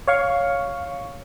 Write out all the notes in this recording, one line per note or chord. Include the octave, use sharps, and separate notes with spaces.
C#5 F5 C#6